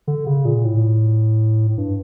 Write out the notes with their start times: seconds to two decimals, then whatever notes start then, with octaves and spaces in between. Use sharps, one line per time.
0.07 D3
0.26 C#3
0.45 A#2
0.64 A2
1.78 G2